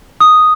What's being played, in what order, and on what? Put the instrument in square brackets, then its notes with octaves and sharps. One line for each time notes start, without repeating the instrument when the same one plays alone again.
[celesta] D#6